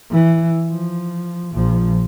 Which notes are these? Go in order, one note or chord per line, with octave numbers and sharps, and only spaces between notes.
E3
F3
A#1 F3